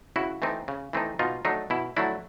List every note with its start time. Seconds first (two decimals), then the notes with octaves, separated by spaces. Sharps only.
0.16 C#3 E4 F#4
0.42 E3 A3 C4 D#4
0.68 C#3
0.93 E3 A3 C4 D#4
1.19 B2 D#4 F4
1.45 F#3 A3 D4 D#4
1.70 B2 E4
1.96 F#3 A3 D4 E4